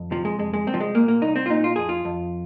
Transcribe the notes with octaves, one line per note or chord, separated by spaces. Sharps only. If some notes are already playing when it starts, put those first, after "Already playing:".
Already playing: F2
C3 F3
G#3
F2 G#3
G#3
C2 C4
F3
G#3
A#2 A#3
A#3
C2 D#4
C4
F4
A#2 D#4
F4
F2 G#4
F4
F2